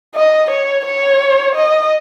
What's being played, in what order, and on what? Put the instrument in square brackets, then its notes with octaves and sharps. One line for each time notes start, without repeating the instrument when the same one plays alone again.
[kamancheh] D#5
C#5
C#5
D#5